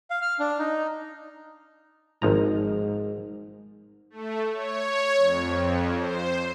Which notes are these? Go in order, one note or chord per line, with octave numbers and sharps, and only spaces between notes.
F5
F6
D4
D#4
G#1 G#2 F3 A#5
A3
C#5
F2
C5